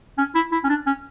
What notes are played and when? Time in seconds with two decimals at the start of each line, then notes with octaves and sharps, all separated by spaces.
0.18 C#4
0.35 E4
0.52 E4
0.64 C#4
0.69 D4
0.87 C#4